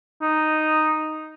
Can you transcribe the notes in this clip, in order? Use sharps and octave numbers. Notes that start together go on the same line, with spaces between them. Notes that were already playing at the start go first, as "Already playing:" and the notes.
D#4